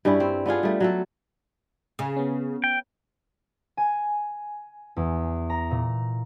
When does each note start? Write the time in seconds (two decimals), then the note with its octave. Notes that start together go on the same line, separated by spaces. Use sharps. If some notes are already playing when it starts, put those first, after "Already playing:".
0.05 G2 G3 C#4 E4
0.20 C4
0.46 B3 D4 F4 G#4
0.63 G3 A3
0.80 F#3 A3 A4
1.99 C#3
2.16 B3 C#4
2.64 G5
3.77 G#5
4.97 E2
5.50 A#5
5.71 A#2